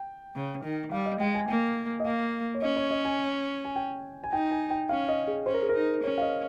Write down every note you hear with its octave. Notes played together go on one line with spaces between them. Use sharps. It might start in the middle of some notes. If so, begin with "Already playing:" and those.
Already playing: G5
C#3
D#3
G3 F5
D#5
G#3 G5
G#5
A#3 G5
D#5
A#3 F5
C#5
C#4 D#5
C#5
D#5
G#5
G#5
G5
G#5
D#4 G5
G#5
G5
C#4 F5
D#5
G#4
C#4 C5
A#4
G#4
D#4 A#4
C#4 C#5
F5
D#5